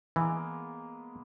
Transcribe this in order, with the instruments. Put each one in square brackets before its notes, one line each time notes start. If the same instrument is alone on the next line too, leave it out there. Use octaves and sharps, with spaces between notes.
[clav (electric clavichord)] E3 [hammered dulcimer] G#3 A#3 B3